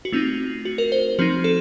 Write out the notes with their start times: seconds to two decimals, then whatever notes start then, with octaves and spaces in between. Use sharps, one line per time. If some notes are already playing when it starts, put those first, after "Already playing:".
0.05 F#4
0.12 A3 C4 D#4 F4
0.65 F#4
0.78 A#4
0.92 C5
1.19 F3 C4 D#4 F#4
1.44 A4